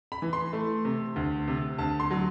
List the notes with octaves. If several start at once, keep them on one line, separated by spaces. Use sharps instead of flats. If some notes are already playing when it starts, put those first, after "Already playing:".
B5
E3
C6
A3
C3
D2
C3
D2 A5
C6
F#3